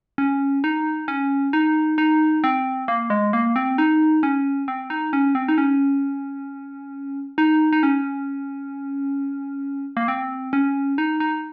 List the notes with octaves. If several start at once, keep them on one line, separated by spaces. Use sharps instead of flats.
C#4
D#4
C#4
D#4
D#4
C4
A#3
G#3
A#3
C4
D#4
C#4
C4
D#4
C#4
C4
D#4
C#4
D#4
D#4
C#4
A#3
C4
C#4
D#4
D#4